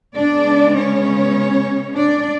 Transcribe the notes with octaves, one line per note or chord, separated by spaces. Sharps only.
C#3 G#3 B3 D4 D5
C#4 C#5
D4 D5